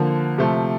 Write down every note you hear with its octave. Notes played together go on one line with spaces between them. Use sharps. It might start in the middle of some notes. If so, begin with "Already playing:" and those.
Already playing: D3 F3 A#3
C3 F3 A3